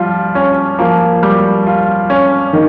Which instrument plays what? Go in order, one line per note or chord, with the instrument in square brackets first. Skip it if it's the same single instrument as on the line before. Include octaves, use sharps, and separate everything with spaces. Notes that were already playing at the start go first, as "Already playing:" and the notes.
Already playing: [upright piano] F3 [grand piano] G3 F4
[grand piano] C#4
[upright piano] F3 [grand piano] A#3
[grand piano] G3
F4
C#4
[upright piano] D#3